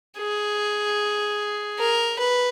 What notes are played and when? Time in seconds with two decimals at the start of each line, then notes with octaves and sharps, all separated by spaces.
0.18 G#4
1.79 A#4
2.19 B4